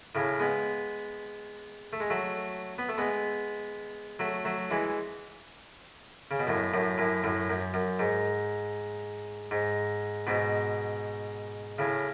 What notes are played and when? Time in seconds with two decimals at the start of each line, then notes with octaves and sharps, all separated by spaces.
0.15 A2 C#3
0.40 G#3 B3
1.93 A3
2.00 G#3
2.10 F#3 A3
2.78 B3
2.89 A3
2.98 G#3 B3
4.19 F#3 A3
4.45 F#3 A3
4.71 E3 G#3
6.31 C#3
6.40 B2
6.47 F#2 A2
6.74 F#2 A2
6.98 F#2 A2
7.24 F#2 A2
7.50 F#2
7.74 F#2
7.99 G#2
9.51 G#2
10.27 G#2 B2
11.78 A2 C#3